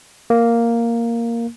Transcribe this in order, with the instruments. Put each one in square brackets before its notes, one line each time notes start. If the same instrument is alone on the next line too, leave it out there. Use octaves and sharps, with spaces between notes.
[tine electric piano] A#3